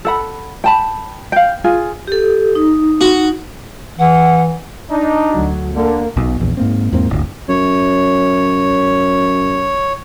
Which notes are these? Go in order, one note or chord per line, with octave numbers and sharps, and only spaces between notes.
A4 F#5 B5
G5 A5 B5
F5 G5
F4 G#4 G#5
G4 A4
D#4
F#4
E3 F#5
D4 D#4
D2 F#3
D3 A#3
B1 B2
A#1 E2
G#2 A#3 C4
E2 G#2 A#3 C4
D1 G1 D2
F#2 C#5